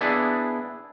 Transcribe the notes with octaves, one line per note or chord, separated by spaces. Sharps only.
B3 D4 E4 G#4 D5